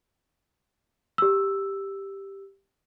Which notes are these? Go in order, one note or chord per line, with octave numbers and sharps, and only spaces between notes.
G4 E6